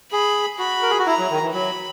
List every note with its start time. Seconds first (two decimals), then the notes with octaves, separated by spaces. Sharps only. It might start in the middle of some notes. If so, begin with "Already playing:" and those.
0.12 G#4 B5
0.59 F#4 B5
0.82 A#4
0.90 G#4
0.99 F#4
1.07 E4 A#5
1.19 F#3
1.30 D#3
1.43 E3
1.54 F#3 B5